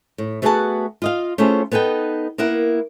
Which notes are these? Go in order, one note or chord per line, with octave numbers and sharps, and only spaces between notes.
A2
A3 B3 F#4 G#4 F#5 A5
F4 D#5 F5
A3 C#4 E4 F4 G#4 C5
B3 D#4 A4 B4 G5
A#3 B3 E4 A#4 F#5